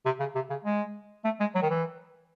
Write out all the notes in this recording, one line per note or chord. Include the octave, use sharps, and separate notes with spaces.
C3
C#3
C3
C#3
G#3
A3
G#3
F#3
D#3
E3